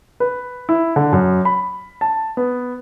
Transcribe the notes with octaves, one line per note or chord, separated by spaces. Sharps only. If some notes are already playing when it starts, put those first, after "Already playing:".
B4
E4
D3
F#2
B5
A5
B3